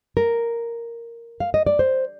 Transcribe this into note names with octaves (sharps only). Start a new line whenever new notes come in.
A#4
F5
D#5
D5
C5